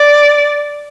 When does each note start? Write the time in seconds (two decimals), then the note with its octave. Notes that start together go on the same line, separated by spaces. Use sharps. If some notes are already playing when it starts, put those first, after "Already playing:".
Already playing: D5